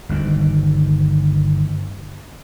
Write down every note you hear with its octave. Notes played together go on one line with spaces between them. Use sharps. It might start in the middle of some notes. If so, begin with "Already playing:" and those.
G1 D2 D#3